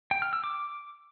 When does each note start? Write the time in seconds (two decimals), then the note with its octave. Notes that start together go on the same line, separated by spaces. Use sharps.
0.11 G5
0.22 F6
0.33 E6
0.44 D6